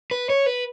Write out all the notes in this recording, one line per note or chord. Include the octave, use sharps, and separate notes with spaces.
B4
C#5
B4